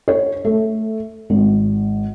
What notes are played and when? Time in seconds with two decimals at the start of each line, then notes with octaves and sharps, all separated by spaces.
0.08 C#5
0.45 A3
1.30 G#1